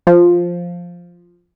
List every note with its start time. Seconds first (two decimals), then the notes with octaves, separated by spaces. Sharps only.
0.07 F3